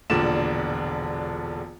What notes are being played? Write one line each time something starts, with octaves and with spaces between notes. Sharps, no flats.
E1 A#1 D3 D5 E7